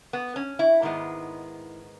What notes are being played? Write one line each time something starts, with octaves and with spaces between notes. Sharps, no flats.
B3
C#4
E4
G#2 D#3 G#3 B3